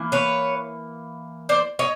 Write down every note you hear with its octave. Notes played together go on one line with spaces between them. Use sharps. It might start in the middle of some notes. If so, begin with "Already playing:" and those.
Already playing: E3 A#3
B4 C#5
C5 D5
C#5 D#5